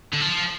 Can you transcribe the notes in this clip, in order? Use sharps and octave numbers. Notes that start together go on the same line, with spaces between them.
D3
F3